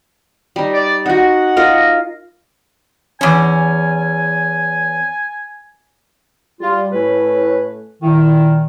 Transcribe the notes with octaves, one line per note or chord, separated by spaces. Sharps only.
G3 D#4
D5
D#4 F#4 F#5
F4 A#4 D#5
E2 C#4 G#5
G3 F4
A2 A3 C#4 E4 B4
A#2 D#3 E4